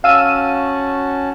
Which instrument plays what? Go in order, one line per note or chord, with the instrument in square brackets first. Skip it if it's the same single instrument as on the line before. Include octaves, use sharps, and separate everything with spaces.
[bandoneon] C#4 F#4 A5 [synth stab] F5 E6 D#7